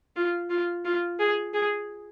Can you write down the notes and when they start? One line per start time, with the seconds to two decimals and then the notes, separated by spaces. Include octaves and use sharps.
0.16 F4
0.50 F4
0.85 F4
1.20 G#4
1.54 G#4